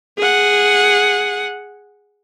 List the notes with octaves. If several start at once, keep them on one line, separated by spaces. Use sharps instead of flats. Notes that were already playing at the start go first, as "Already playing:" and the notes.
G#4 F#5